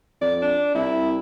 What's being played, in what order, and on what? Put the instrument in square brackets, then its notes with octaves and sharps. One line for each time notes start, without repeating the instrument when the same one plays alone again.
[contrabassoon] F2 [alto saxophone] D5
[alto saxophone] D4
[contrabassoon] C2 [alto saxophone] E4